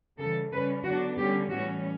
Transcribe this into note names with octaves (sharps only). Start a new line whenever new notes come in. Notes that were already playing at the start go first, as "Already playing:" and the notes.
C#3 E3 G3 A4
C#3 G3 C#4 B4
D3 F#3 B3 D4 F#4
D3 G3 C#4 G4
A2 E3 G3 C#4 F#4